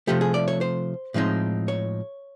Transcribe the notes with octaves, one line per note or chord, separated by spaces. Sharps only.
C3 F3 A3 G4
G#4
D5
C#5
C5
A2 F3 G#3 C4 D#4
C#5